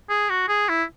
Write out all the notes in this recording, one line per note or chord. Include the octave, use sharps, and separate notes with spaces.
G#4
F#4
G#4
E4